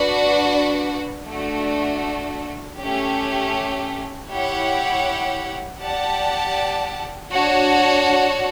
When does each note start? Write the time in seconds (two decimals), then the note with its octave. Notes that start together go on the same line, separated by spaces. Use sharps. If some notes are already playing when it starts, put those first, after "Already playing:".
Already playing: D4 F#4 B4 D5 F#5
1.27 A3 D4 F#4
2.79 A3 C#4 G4
4.29 E4 G4 C#5 F#5
5.81 G4 D5 F#5 A5
7.32 D4 F#4 C#5 F#5 A5